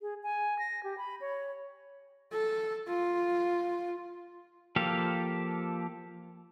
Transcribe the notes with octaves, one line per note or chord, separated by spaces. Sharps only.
G#4
G#5
A#6
G4
B5
C#5
A4
F4
F3 A#3 G4 A4 F5